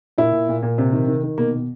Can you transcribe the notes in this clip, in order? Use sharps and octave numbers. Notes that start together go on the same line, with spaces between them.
A#2 E4
A#2
A#2
A#2
C3
D#3
D#3
D#3
B2 A#3
B2